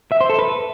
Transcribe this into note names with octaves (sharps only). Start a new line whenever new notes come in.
E5
C5
A4
B4